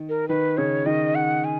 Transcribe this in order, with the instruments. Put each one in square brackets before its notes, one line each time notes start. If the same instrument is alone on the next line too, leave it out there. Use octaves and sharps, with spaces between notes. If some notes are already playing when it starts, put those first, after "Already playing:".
Already playing: [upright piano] D#3
[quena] A#4
[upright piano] D#3 [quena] B4
[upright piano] C#3 [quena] C#5
[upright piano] D#3 [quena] D#5
[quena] F#5
G#5